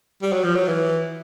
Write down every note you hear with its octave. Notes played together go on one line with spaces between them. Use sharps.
G3
F#3
F3
F#3
E3